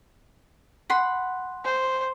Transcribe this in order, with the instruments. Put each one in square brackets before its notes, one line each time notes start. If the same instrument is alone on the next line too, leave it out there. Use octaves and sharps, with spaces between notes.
[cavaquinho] F#5 B5 C6
[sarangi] C5